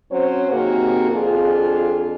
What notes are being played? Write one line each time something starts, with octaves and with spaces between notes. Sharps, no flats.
F#3 C4 C#4 C5 C#5
C3 D#3 A#3 F#4 G#4
F2 D4 F4 G#4